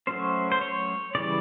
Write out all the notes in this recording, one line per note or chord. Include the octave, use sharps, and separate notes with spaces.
F#3 A3 C#4 C5
C5
C#5
C#3 E3 G3 D5